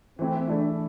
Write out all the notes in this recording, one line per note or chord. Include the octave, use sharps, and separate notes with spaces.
E3 A3 C4 E4
E3 A3 D4 E4